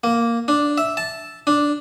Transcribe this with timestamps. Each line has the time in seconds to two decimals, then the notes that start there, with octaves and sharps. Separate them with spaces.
0.04 A#3
0.48 D4
0.78 E5
0.97 A5
1.47 D4